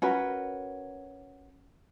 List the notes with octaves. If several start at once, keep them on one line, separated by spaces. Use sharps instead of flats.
C#4 F#4 A#4 B4